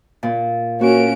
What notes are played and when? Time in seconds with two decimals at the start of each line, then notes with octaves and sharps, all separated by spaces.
0.23 A#2
0.81 A#3 C#4 F#4 D7